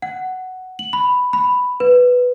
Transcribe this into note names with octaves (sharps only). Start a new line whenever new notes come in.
F#5
F#7
B5
B5
B4